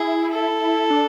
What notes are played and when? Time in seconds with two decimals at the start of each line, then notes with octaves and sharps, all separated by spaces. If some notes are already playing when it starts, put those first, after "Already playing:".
Already playing: E4 G#4
0.31 A4
0.90 D4